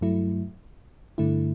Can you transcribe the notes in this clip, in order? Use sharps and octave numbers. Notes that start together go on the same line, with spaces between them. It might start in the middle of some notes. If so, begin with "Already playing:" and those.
G2 F#3 A3 E4
G2 D3 A3 E4